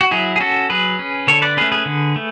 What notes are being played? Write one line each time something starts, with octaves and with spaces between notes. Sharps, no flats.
F#4
F#3 E4 G#4
G#4
C#4 F#4 A4
F#3 G#4 B4
C#4
D3 A4 C#5
B4 D5
A3 C#4 G#4 B4
G#4 B4
D3
A3